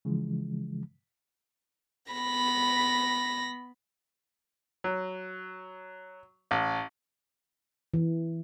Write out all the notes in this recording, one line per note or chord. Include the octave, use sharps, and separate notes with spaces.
C#3 E3 F3 G#3
B3 B5 A#6
F#3
A1
E3